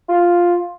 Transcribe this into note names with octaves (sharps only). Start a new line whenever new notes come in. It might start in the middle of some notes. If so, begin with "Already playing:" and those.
F4